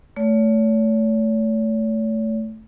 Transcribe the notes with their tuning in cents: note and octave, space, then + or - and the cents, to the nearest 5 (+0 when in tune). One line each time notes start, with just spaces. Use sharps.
A3 +0 C#5 +40